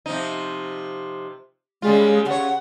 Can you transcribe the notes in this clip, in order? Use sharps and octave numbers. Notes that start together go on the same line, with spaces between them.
C3 F3 D#4
C#3 G3 G#3 F4
C#3 C#5 F#5